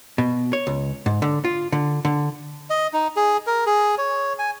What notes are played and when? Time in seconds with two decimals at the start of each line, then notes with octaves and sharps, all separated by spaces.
0.18 B2
0.53 C#5
0.67 C#2
1.06 G#2
1.22 D3
1.45 F4
1.72 D3
2.05 D3
2.70 D#5
2.93 D#4
3.16 G#4
3.47 A#4
3.66 G#4
3.98 C#5
4.39 G#5